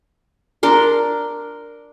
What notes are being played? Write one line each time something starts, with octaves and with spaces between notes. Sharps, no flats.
D4 A#4 C6